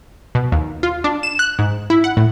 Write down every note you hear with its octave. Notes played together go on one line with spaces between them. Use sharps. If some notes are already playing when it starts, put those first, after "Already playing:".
B2
D#2
F4
D4
E7
F#6
G#2
E4
F#5
A2